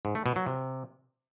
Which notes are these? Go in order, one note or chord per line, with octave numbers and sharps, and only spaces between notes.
G#2
A3
B2
F#3
C3